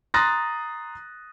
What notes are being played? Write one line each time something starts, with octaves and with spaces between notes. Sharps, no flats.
A#5 C6 D#6 F#6 A6 A#6